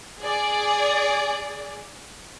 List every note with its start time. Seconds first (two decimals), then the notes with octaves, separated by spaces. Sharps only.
0.21 G#4 D5